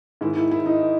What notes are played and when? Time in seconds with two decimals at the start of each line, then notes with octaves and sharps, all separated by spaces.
0.21 G#2 D#3 E4
0.37 E4
0.51 E4
0.66 D#4